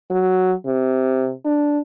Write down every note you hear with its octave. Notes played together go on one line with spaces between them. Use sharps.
F#3
C3
D4